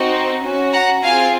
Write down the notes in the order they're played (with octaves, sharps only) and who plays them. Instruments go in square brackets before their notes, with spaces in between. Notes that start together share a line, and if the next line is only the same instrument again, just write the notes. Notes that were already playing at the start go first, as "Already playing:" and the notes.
Already playing: [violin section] C4 D#4 F#4
C#4 F#4
F#5 A#5
C4 F4 G#4 F5 G#5